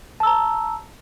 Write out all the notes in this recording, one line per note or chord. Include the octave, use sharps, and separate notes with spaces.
A5 A#5 E6